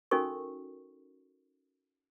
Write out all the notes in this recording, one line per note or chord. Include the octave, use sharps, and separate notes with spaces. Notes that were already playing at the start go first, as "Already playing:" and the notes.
C#4 D#4 F#4 A4 A#4 C#6